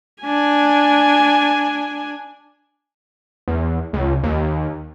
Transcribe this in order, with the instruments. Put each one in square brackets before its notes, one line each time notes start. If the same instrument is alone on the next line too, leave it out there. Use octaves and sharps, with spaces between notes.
[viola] D4 G#5
[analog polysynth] E2
C#2
D#2